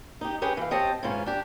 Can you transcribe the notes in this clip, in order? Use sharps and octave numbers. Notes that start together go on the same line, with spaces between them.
D#4 G4
C#4 G4 G#4 B4
E3 F5
C4 G4 C#5 D#5 G5 A5
G#2 E3 C#4 F4
D4 G4